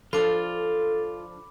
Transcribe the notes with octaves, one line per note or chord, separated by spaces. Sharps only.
F3 D4 F4 A4 B5 D6 F6